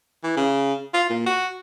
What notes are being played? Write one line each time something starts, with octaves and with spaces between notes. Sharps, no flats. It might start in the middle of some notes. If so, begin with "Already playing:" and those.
E3
C#3
F4
A#2
F#4